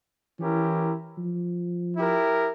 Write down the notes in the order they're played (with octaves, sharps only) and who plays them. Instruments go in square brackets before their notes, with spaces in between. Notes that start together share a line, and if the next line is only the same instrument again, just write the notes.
[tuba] E3 [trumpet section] C#4 E4 G4 A#4
[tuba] F3
[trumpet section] E4 G4 A#4